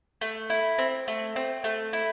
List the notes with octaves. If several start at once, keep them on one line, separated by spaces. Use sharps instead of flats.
A3
E4
C4
A3
C4
A3
E4